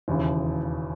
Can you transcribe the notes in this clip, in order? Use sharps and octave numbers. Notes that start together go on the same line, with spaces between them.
E1 D#2 C#3 E3